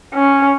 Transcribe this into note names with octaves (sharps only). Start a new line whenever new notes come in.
C#4